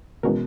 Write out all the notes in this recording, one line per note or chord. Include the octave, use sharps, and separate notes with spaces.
B2 E3 G#3 C#4 F#4 A#4